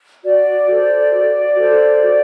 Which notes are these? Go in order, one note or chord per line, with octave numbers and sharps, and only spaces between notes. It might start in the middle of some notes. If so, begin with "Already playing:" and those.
F#4 D5
A4 C5
F#4
A4 C5
F#4